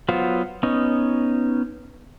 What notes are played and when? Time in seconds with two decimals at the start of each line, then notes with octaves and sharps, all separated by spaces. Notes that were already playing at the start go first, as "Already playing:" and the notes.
0.09 F#3 B3 F4 C5
0.63 B3 C#4 D#4